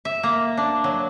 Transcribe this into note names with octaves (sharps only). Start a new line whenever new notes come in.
E5
A#3
D4
F#3